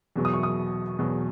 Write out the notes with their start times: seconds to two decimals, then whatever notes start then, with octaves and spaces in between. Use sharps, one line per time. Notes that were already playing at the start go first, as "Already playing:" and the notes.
0.16 E2 B2 F#3
0.25 D#6
0.33 C#6
0.43 D#6
0.99 E2 B2 F#3